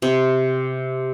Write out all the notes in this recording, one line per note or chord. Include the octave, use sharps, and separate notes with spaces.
C3